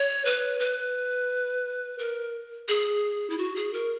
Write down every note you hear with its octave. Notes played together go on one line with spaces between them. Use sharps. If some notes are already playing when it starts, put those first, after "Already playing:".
Already playing: C#5
B4
B4
A#4
G#4
E4
F#4
G#4
A#4